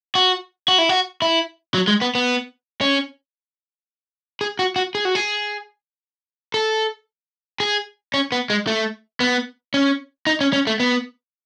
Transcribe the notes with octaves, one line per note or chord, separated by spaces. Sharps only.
F#4
F#4
E4
F#4
E4
F#3
G#3
B3
B3
C#4
G#4
F#4
F#4
G#4
F#4
G#4
A4
G#4
C#4
B3
G#3
A3
B3
C#4
D#4
C#4
C#4
A3
B3